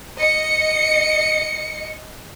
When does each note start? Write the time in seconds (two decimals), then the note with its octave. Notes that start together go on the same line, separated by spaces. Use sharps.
0.18 D#5 C#7